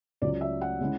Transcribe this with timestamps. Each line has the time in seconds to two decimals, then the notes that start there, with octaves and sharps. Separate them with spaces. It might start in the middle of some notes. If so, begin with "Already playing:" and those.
0.22 C#2 C#3 F#3 D5
0.41 E5
0.61 F#5
0.80 C#3 G#3 C#4 E4